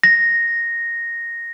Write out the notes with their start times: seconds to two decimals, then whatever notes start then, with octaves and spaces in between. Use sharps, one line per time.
0.04 A#6